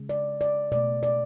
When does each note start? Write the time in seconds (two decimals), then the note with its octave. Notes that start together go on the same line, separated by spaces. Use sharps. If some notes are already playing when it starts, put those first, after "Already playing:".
Already playing: C#3 G#3
0.09 D5
0.41 D5
0.72 B2 A3 D5
1.03 D5